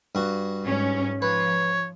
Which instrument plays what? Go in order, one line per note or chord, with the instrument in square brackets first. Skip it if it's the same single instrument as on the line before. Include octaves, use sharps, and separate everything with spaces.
[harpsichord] G2 F#4
[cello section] G#2 C#4
[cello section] F3 [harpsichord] B4 [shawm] C#5